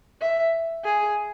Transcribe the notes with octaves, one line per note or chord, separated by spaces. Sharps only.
E5
G#4